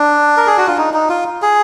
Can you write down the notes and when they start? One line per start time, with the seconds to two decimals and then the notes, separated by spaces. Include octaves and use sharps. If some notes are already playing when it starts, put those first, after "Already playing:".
Already playing: D4
0.37 A#4
0.47 G#4
0.58 F#4
0.67 F4
0.78 D#4
0.94 D#4
1.10 F4
1.42 G#4